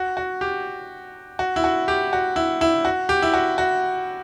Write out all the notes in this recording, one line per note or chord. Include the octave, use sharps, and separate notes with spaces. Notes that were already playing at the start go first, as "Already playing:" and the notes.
Already playing: F#4
F#4
G4
F#4
E4
F#4
G4
F#4
E4
E4
F#4
G4
E4
F#4
F#4